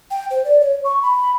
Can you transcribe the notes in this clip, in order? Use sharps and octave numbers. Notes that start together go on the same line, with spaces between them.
G5
C5
D5
C#5
C#6
B5